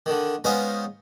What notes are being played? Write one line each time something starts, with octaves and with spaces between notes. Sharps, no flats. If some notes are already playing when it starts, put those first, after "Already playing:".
D3 D#3
G#3 B3 C#4 D#4 F4 C5